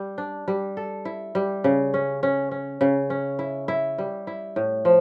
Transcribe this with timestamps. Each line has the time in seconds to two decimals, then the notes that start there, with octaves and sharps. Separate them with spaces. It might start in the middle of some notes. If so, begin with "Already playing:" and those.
Already playing: G3
0.18 D4
0.48 G3
0.77 A4
1.05 E4
1.35 G3
1.64 C#3
1.94 C#4
2.23 C#4
2.51 C#4
2.81 C#3
3.10 C#4
3.39 E4
3.68 E4
3.98 G3
4.27 E4
4.56 A2
4.85 F3